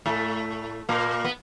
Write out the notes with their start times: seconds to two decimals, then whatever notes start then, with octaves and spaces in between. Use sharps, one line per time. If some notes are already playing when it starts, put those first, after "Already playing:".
0.06 A2 A3
0.89 A#2 A#3
1.25 B3